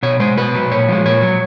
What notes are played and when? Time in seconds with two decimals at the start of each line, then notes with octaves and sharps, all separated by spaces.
0.03 B2 C#5
0.20 G#3 C5
0.37 B2 B4
0.54 F#3
0.71 A#2 C#5
0.88 F3 G#3
1.05 A#2 C#5
1.22 F#3